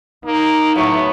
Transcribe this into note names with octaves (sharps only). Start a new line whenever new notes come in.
A#3 D#4
A2 F#3 A3 B3